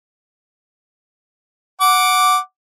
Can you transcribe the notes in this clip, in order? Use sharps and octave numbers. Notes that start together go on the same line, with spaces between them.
F#5 D6